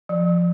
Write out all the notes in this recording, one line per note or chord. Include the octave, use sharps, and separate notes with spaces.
F3
F3